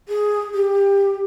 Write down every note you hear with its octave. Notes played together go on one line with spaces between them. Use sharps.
G#4
G4